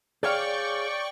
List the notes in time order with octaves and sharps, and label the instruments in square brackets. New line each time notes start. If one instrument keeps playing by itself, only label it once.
[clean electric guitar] G#4 C#5 F5 [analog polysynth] D5 G5 C#6